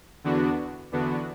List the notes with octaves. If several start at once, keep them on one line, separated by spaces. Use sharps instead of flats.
E2 D3 B3 D4 F#4
E2 D3 B3 D4 F#4